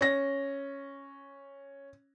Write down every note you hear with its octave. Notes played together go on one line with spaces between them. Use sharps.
C#4 A#6